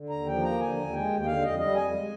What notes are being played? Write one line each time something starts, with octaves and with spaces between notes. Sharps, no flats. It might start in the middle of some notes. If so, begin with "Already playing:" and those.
Already playing: D3
D#2 A#5
F3 G5
A#3 A#5
D3 G#5
D#2
G#3 G5
D#2
G5
D3 F5
F2 D#5
G3 D#5
F2 G#5
G#3